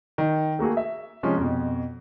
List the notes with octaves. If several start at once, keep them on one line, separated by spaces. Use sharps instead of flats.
D#3
A3 A#3 F#4 G#4
E5
C3 F3 G#3 C#4
F2 B2